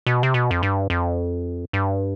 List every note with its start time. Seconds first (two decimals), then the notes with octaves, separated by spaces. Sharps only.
0.06 B2
0.23 C3
0.34 B2
0.51 F2
0.63 G2
0.90 F2
1.73 G2